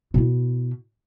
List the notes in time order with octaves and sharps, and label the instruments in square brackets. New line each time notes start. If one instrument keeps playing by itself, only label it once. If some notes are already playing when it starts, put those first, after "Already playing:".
[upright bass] B2 E4